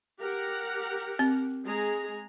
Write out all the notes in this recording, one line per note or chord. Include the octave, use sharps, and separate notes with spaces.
G4 A#4 F#5
C4
G#3 G#4 A#5